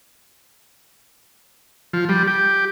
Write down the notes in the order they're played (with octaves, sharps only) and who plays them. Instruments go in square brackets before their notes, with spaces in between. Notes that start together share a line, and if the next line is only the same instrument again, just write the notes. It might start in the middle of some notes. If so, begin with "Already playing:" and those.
[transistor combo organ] F3
G3
G4